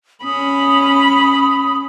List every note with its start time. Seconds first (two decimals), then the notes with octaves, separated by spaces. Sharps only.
0.24 C#4 B5 D#6